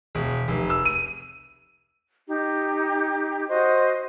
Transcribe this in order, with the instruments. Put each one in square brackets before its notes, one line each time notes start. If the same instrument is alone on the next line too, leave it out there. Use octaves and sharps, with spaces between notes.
[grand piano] E1
F1
E6
D#7
[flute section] D#4 G4
F#4 C5 D#5